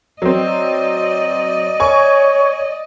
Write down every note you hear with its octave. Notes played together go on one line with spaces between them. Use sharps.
F#3 C4 D5 D#5
C#5 G#5 C#6